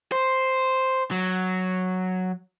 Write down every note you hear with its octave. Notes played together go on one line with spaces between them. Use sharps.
C5
F#3